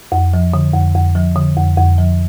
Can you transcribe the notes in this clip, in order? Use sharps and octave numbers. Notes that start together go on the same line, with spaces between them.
F2
F3
D3
F2
F2
F3
D3
F2
F2
F3